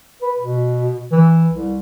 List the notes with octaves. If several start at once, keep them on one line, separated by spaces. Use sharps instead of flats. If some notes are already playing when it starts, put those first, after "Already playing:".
B4
B2
E3
C2